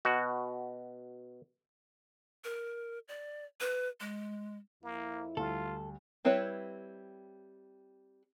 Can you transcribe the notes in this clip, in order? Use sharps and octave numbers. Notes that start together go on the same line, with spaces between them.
B2 F#4
A#4
D5
B4
G#3
F2 A#3 E4
D2 G3 F4 A4
G3 C4 E4 B4 C#5